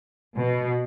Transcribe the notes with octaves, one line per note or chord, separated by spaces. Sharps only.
B2